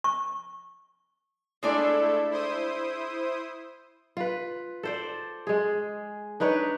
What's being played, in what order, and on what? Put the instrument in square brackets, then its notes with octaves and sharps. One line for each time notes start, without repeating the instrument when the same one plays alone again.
[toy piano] C#6
[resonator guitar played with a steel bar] G#3 D4 D5 [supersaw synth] A3 E4 A4
[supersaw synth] E4 C5 D#6
[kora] F4 B4
A4 C5 D5
G#3 G#4
D4 D#4 B4 C#5